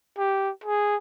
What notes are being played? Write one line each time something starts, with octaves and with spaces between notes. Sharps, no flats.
G4
G#4